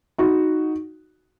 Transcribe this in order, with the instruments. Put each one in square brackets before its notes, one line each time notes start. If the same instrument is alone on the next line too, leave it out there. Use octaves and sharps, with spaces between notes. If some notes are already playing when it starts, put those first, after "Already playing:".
[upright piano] D#4 F#4